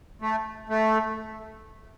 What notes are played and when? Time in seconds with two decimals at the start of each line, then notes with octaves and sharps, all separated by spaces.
0.22 A3
0.69 A3